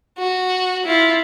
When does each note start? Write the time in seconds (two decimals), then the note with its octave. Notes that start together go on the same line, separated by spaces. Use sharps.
0.18 F#4
0.84 E4 F4